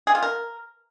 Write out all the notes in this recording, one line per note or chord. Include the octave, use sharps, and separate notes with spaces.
G#4
F4
A#4